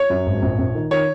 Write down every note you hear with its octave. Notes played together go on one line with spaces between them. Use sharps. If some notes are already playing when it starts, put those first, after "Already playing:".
Already playing: C#5
F#2
G#1
A#1
A#1
D#3
D#3 C#5